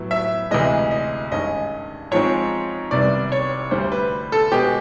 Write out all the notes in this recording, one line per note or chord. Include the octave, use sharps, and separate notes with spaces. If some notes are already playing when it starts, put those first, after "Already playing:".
Already playing: A2 F#3 B3
E5
D2 C3 E3 G#3 D#5
D#5
G2 D#3 G#3 C#4 D#5
G#2 F3 G#3 C4 C#5
C2 C3 D#3 G3 B3 D5
C#5
D2 D3 G3 C5
B4
A4
B2 G#3 B3 G4